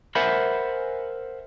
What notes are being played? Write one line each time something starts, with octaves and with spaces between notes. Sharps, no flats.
A#4 C5 E5 F#5 G#5 B5